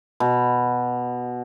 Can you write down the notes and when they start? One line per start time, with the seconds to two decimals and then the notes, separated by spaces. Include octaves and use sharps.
0.20 B2